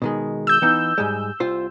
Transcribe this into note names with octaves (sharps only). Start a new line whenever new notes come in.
B2 D#3 G#3
E6 G6
E3 B3 D#4
G#2 G3 G#3
C2 F4 C5